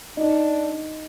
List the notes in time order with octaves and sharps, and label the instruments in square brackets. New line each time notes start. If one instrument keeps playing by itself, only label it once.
[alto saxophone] D4 [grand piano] D#4